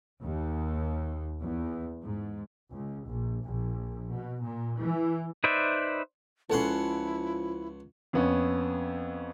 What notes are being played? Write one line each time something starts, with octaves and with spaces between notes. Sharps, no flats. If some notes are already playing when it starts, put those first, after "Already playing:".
D#2
E2
G#2
C#2
A#1
A#1
B2
A#2
E3
D#4 B4 C5 D5 E5
C#2 F3 C#4 E4 A4 F#5 C6
F2 B3 C#4